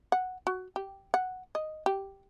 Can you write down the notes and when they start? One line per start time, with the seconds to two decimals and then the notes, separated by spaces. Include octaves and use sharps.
0.12 F#5
0.47 F#4
0.76 G4
1.14 F#5
1.55 D#5
1.86 G4